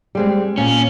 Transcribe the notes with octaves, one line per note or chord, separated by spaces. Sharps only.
G3 G#3 C4
A#2 C#4